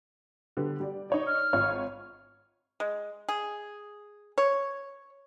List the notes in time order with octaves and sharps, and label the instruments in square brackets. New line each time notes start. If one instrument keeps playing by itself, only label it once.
[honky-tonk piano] D3 G3 B3
G3 D5
D#4 C#5 D5
[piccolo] F6
[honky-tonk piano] G#1 F4 C#5
[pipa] G#3
G#4
C#5